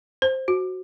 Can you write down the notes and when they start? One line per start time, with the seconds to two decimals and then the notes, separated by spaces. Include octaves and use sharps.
0.22 C5
0.48 F#4